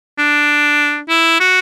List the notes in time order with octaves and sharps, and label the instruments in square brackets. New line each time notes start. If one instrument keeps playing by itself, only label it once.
[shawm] D4
E4
F#4